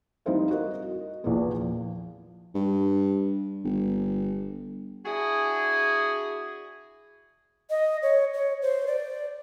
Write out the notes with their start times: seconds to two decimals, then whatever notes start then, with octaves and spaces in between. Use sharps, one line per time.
0.26 G3 C4 D#4 E4 C5 F5
0.51 F#4 A#4 D#5
0.82 D#5
1.24 A#1 E2 A#2 E3 B3
1.61 F3
2.55 G2
3.65 G1
5.06 D4 E4 F#4 G#4
7.70 D#5
8.02 C#5
8.34 C#5
8.62 C5
8.87 D5